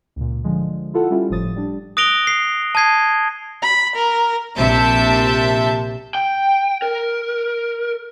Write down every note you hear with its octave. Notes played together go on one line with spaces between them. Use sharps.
C#2 A#2
D3 F3 G#3
E4 F4 A4 F#5
G3 C#4 E4 F4
G1 A2 F3 D#6 A6
G3 D4
D#6 F#6 A#6 D7 F7 G7
C7
A5 D#6 G#6 C7
B5
A#4
A#1 C3 E5 A5 G6
G5
A#4